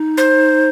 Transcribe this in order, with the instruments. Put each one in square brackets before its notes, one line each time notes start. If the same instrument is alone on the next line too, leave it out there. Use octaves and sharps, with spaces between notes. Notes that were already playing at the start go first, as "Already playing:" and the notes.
Already playing: [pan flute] D#4
[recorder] C5